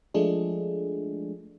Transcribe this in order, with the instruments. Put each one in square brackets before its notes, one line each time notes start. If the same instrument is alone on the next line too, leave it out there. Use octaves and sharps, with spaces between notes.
[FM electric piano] F3 G#3 A3 D4 G#4